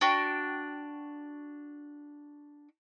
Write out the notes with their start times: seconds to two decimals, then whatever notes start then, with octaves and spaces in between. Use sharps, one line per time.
0.01 D4 F#4 G5